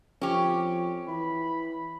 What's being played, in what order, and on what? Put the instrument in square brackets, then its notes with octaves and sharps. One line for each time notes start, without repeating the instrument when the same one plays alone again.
[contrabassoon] F2 [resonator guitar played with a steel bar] C#4 G4
[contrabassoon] E3 [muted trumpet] B5